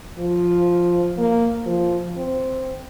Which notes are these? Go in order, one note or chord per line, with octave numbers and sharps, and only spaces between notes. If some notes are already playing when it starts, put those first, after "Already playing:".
F3
A#3
F3
C4